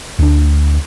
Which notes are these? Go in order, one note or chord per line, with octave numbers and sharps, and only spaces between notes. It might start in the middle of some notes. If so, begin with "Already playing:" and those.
D2 D4